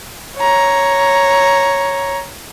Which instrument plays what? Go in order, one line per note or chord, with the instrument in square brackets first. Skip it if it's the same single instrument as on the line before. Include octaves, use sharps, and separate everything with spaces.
[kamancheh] C#5 A#5